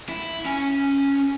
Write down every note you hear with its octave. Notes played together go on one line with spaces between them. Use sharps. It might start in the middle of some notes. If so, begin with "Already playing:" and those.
E4
C#4 G#5